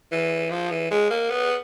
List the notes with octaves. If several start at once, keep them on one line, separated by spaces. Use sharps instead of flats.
E3
F3
E3
G#3
A#3
B3